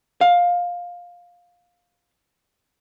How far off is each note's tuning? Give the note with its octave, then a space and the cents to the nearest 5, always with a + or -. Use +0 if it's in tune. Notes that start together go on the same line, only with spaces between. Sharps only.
F5 +15